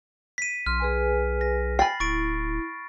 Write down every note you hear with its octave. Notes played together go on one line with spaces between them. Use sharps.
B6 D#7
B1 C6 F6
G#4 B4 G#5
A#6
G5 G#5 B5 A6 C7
D1 E4 C#6 A6 D7